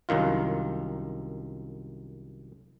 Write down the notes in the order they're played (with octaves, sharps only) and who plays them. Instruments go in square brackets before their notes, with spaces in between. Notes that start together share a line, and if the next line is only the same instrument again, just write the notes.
[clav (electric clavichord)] C2 F#2 D#3 F4